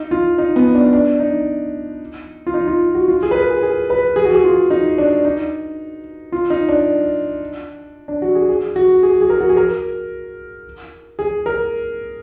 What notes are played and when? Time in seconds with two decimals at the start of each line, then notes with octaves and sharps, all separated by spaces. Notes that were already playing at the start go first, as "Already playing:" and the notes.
Already playing: D#4
0.11 F4
0.38 D#4
0.56 B3
0.74 D4
0.93 D4
1.20 D#4
2.46 F4
2.54 D#4
2.67 F4
2.95 F#4
3.08 F4
3.23 G#4
3.31 B4
3.35 A#4
3.50 G#4
3.62 G#4
3.90 B4
4.16 G#4
4.25 F#4
4.34 G#4
4.44 F4
4.70 D#4
4.98 D4
5.25 D#4
6.32 F4
6.50 D#4
6.69 D4
8.08 D4
8.22 F#4
8.35 G#4
8.49 G#4
8.76 F#4
9.03 G#4
9.21 G#4
9.30 A#4
9.41 F#4
9.49 G#4
9.57 A#4
11.19 G#4
11.46 A#4